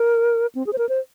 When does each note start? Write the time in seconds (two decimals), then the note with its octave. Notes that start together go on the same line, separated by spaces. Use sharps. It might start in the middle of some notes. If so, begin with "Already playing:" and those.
Already playing: A#4
0.55 C4
0.67 G#4
0.73 C5
0.78 A#4
0.89 C5